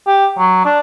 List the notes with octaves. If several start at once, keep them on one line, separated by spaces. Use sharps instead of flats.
G4
F#3
D4